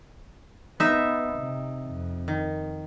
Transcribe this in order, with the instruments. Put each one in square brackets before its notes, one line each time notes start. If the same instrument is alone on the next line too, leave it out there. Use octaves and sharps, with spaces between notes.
[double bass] B3 [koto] D#4 E5
[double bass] C3
F2
[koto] D#3